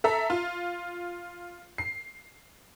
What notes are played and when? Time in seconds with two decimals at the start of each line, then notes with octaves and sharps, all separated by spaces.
0.04 A4 E5 A#5
0.30 F4
1.78 C7